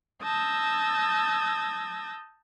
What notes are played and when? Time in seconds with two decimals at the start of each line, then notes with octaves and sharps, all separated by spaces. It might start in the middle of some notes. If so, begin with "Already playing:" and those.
0.24 A5 D#6 E6 G6 G#6 A#6